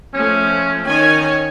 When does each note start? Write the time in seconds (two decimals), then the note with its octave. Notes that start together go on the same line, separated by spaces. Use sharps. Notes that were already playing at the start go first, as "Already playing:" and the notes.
0.14 F3 A3 C#4
0.86 D#3 C#4 C#5 G#5